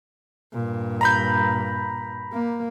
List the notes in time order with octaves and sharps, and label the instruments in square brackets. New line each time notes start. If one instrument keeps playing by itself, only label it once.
[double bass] G2 A#2
[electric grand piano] A#5 B5 G6
[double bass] A#3